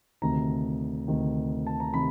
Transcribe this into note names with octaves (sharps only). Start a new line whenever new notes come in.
D2 C3 D#3 A#5
D2 C3 D#3
A5
A#5
C3 D#3 B5